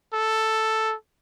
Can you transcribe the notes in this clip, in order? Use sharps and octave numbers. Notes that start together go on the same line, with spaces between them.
A4